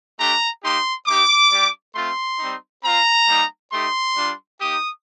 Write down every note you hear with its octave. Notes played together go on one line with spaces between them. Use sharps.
A3 D4 G4 A#5
A#3 D#4 G4 C6
A#3 D#4 G4 D6
G3 D4 G4
A3 C4 F4 C6
G3 C4 D#4
C4 F4 A#5
G3 A#3 D#4
A3 D#4 G4 C6
G3 D4 F4
A#3 D#4 G4 D#6